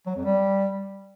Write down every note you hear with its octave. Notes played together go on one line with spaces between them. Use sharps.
F#3
F2
G3